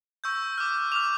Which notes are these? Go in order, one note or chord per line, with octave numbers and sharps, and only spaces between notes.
C#6 E6 G6
D6 F6
D6 F6 F7